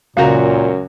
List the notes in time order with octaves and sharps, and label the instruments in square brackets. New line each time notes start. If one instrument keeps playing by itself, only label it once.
[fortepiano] C#2 F#4 A#5 [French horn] F#2 [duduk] A#2 [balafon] A#4 F5